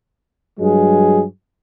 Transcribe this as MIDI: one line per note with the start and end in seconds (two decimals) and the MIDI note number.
0.60 1.23 43
0.60 1.23 54
0.60 1.23 56
0.60 1.23 68